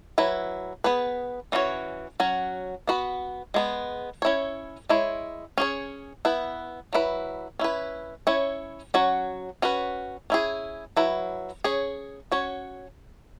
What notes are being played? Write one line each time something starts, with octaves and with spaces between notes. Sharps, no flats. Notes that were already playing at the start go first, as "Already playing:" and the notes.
F#3 E4 B4
B3 G#4 B4
E3 C#4 F#4 C#5
F#3 C#4 F#4
B3 F#4 B4
G#3 B3 G#4
C#4 E4 C#5
G#3 E4 C#5
C#4 G#4 C#5
B3 E4 B4
F#3 E4 B4
C#4 E4 B4
C#4 E4 C#5
F#3 C#4 F#4 C#5
C#4 F#4 B4
C#4 E4 G#4
F#3 E4 B4
C#4 G#4 C#5
C#4 F#4 C#5